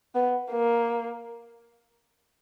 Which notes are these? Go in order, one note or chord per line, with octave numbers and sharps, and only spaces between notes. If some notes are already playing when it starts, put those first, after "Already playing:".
B3
A#3